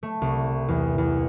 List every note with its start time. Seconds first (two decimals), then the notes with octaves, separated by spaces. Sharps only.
0.03 A3
0.22 C2
0.68 E2
0.98 E2